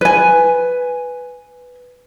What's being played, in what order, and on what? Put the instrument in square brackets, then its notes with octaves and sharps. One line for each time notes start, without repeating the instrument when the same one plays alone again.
[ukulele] B4 G#5